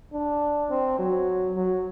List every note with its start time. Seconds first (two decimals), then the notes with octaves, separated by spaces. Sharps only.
0.13 D4
0.70 C4
0.99 F#3
1.56 F#3